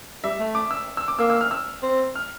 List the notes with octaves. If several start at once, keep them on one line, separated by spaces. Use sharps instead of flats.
G3 E5
A3
D6
E6
E6
D6
A#3 E6
E6
F6
E6
C4
F6